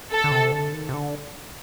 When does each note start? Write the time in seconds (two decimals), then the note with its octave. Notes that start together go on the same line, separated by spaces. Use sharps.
0.11 A4
0.24 D3
0.32 C3
0.52 D3
0.73 D#3
0.89 C3
0.94 D3